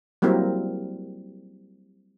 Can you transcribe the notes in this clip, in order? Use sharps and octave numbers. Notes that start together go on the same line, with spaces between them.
F#3 G3 A#3 C4 E4 A#4